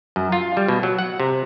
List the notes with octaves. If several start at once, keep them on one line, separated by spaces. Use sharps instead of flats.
F#2
F4
G3
B2
F#3
F#5
C3